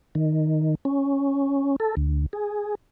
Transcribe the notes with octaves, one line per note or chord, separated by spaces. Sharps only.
D#3
C#4
A4
D2
G#4